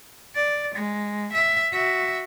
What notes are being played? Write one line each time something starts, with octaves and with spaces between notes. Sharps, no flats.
D5
G#3
E5
F#4 E5